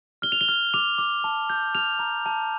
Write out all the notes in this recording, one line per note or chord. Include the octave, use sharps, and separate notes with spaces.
F6 G7
F7
G7
F6
D6 F7
D6
A5
G6
F6 F7
A#5
A5